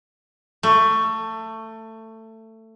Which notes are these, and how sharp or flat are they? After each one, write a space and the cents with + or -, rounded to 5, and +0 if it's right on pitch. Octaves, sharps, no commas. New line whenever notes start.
A3 +20